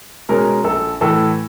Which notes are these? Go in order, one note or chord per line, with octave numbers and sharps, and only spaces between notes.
B2 G#3 C#4 A#4
A#1 A4
A2 E3 A4